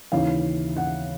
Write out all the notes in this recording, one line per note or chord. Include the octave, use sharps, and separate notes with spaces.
D#2 C#3 E3 F5
F#5